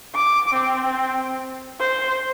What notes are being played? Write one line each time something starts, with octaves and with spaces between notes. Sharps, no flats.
D6
C4
C5